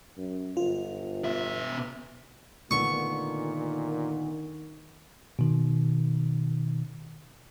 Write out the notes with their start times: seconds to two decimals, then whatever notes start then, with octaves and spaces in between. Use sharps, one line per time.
0.17 F#2
0.57 G1 F4
1.24 B2 E5
2.71 A#2 D3 D#3 A3 B3 C#6
5.39 B2 D#3